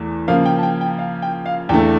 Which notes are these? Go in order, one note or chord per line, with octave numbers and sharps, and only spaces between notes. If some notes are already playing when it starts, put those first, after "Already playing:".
Already playing: E2 E3 A3
C#3 F3 A#3 F5
G5
A5
G5
G5
F5
G5
F5
E2 D3 A3 G5